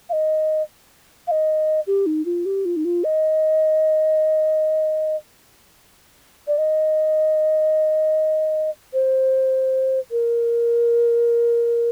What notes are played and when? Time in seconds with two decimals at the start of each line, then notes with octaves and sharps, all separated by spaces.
0.09 F5
0.13 D#5
1.27 F5
1.31 D#5
1.87 G4
2.06 D#4
2.25 F4
2.45 G4
2.65 F4
2.76 D#4
2.85 F4
3.04 D#5
6.47 D5
6.58 D#5
8.93 C5
10.11 A#4